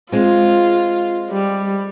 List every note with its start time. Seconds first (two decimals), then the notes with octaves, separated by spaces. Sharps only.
0.12 G#3 C4 F4
1.31 G3